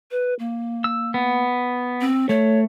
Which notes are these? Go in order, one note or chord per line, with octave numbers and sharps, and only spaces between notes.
B4
A#3
E6
B3
C4
A3 C#5